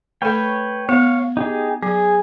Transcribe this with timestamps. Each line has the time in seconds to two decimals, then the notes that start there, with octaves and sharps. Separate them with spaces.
0.22 A3 A4 B4 C#5 G5
0.89 B3 C#5 F5
1.37 D#4 G4 G#4
1.83 F#3 G#4